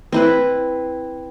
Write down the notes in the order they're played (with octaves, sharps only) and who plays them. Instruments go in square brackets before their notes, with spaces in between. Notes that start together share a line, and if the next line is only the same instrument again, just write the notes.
[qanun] C4 E4 B4